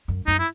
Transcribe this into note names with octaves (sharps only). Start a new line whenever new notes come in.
F#2
F#2 D#4
E4